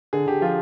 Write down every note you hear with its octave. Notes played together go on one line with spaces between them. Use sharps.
D3 G#4
D3 G4
F3 F4